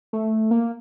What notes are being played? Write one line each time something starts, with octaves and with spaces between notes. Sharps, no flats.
A3
A#3